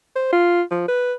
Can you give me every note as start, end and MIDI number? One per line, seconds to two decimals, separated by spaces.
0.16 0.28 72
0.32 0.62 65
0.71 0.87 53
0.88 1.14 71